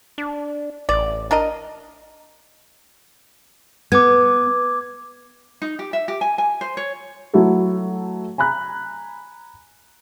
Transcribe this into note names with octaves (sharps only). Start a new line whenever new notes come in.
D4
A1 D5
D4 A#4 D#5
B3 D6 G#6
D#4
G4
E5
G4
G#5
G#5
C5
C#5
F#3 A3 E4 F#4 A4
G#5 A#5 B5 F#6